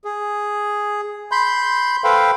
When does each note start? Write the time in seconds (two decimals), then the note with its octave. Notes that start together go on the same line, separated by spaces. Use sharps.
0.04 G#4
1.32 B5 C6 G6
2.04 A4 B4 C5 F5 G5 B5